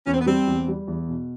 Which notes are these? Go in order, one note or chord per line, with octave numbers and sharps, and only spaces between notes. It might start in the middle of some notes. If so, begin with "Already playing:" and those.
E2 C#4
C4
B3
G3 C4
E2
G3
E2
B2